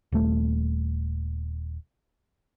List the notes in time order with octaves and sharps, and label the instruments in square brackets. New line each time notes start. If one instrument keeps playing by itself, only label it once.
[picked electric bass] D#1 A3